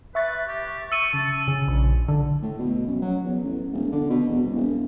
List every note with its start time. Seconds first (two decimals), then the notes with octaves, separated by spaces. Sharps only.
0.15 B4 E5 C#6 A6
0.47 G4
0.92 C#6 E6 D#7
1.14 C#3 A5
1.48 C#3
1.68 A#1
2.08 D3
2.42 A2
2.59 B2
2.87 F#2
3.02 F#3
3.24 E2
3.44 A1
3.73 E1
3.92 D3
4.10 B2
4.29 E2
4.43 C2
4.56 E1